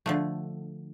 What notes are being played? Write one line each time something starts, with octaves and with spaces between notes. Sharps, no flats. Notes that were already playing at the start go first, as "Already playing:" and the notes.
D3 F3 A3